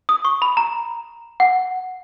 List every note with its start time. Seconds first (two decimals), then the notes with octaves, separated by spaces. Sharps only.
0.09 D#6
0.25 C#6
0.42 B5
0.57 A#5
1.40 F#5